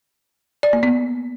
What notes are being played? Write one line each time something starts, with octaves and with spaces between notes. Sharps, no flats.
D5
A#3
B3